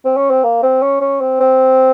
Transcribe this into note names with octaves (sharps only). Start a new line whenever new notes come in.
C4
C#4
C4
A#3
C4
C#4
C#4
C4
C4